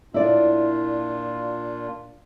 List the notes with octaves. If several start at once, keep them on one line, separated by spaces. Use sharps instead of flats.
A#2 D4 E4 F4 D5